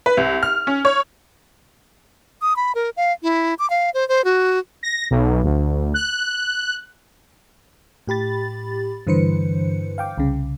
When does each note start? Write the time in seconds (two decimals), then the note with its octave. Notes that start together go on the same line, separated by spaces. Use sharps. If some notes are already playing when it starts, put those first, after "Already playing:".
0.06 B4
0.17 C2
0.43 F6
0.67 C#4
0.85 C#5
2.42 D#6
2.56 B5
2.75 A#4
2.97 F5
3.23 E4
3.59 D6
3.70 F5
3.94 C5
4.08 C5
4.24 F#4
4.83 A#6
5.11 B1
5.44 D2
5.94 F#6
8.08 A2 G4 B5 A6
9.07 G2 D3 E3 B4 C5 C#7
9.98 F5 G5 D6
10.18 C2 C#3